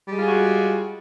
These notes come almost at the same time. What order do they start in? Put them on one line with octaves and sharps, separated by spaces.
G3 G#3 F4 G#4 F#4